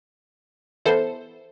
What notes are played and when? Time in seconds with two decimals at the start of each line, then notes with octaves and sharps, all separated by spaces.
0.85 E3 B3 E4 A4 C5